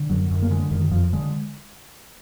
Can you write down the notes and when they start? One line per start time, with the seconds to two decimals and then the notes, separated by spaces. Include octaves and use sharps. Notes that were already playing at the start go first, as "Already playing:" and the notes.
Already playing: D3
0.10 F#2 F#3
0.31 F#2
0.42 A#3
0.51 D3 G#3
0.71 F#2 D#3
0.91 F2 F3
1.13 D3 G#3